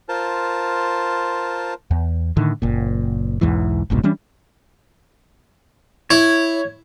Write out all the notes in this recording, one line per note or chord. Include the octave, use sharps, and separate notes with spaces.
F4 A#4 C5 A5
E2
A2 D3 D#3
F#1 A#2
B1 E2 G#2 E3
F#1 C2 G#2 B2
E3 G3 C#4 D4
E4 C#5